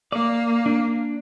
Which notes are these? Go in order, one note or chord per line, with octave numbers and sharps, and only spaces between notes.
A#3 D5
D4